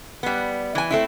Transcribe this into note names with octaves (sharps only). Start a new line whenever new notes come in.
G3 B3
E3 G#5
A3 C4 E4